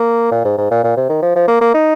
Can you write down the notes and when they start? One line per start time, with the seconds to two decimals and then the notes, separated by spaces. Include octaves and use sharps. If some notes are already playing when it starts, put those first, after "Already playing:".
Already playing: A#3
0.31 A#2
0.45 G#2
0.58 G#2
0.71 A#2
0.84 A#2
0.97 C3
1.09 D#3
1.22 F3
1.36 F3
1.48 A#3
1.61 A#3
1.74 D#4